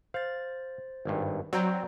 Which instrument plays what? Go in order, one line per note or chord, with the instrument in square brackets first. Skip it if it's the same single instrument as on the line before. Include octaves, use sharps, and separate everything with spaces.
[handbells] C5 A6 [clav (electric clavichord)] F5
[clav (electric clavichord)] G#1 G2
[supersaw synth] F#3 [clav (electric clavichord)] C4 G5 [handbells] D5 A#5